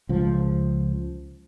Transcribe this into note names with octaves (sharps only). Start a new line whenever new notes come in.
C#2 F3